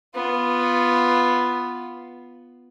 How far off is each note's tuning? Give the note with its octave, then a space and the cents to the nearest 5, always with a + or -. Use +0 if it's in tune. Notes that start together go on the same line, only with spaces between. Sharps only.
B3 +0 F4 +0